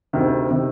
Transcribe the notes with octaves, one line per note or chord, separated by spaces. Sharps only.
D2 C3 D#3
C3 D#3